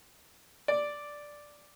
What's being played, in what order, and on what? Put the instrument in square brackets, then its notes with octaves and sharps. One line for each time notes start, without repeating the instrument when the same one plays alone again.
[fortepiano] D5